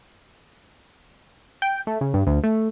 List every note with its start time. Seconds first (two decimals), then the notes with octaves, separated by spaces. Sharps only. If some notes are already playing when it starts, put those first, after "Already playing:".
1.62 G5
1.87 A3
2.01 C#3
2.14 G2
2.27 D2
2.44 A3